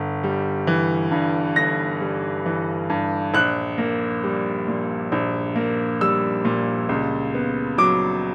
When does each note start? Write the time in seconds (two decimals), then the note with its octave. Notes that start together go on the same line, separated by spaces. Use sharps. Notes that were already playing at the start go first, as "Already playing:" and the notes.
Already playing: G1
0.24 G3
0.67 E3
1.12 G2
1.56 G1 A#6
2.01 G3
2.46 E3
2.90 G2
3.34 A#1 F#6
3.78 A#3
4.24 G3
4.68 A#2
5.12 A#1
5.56 A#3
6.01 G3 E6
6.45 A#2
6.89 C#2
7.34 B3
7.78 F#3 D6